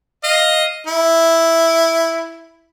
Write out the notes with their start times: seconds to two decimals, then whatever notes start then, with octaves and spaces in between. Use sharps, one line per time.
0.24 D#5 F5
0.87 E4